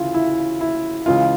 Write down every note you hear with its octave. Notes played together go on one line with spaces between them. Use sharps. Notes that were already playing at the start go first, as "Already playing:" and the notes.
Already playing: D2 C#3 E3 E4 F4
E4
E4
C#2 C#3 E3 F4